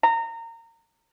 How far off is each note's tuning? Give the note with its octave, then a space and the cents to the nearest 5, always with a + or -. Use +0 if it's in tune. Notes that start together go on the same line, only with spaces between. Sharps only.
A#5 -25